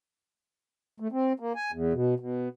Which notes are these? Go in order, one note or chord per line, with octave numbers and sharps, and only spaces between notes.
A3
C4
A#3
G#5
E2
B2
B2